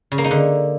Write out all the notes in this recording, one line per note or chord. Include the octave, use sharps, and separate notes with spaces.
C#3
A#3
D#4
D3